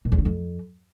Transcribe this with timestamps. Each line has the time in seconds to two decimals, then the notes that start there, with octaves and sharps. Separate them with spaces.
0.05 A#2
0.12 E2
0.18 D3
0.25 F2